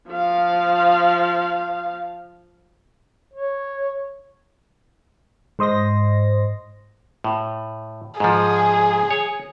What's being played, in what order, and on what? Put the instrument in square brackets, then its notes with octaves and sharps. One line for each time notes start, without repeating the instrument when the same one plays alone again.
[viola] F3 F5
[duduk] C#5
[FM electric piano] G#2 C5 D#5 C6 A#6
[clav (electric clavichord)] A2
[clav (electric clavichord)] G#2 F3 [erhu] G#4
[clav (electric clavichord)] C#5